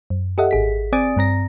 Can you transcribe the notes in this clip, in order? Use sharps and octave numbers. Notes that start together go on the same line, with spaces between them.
F#2
G4 A4 D#5 E5 F#5
G#1 G#4 B6
C4 D5 G#5 D#6 A6 D7
G2 C4 A#5 A#6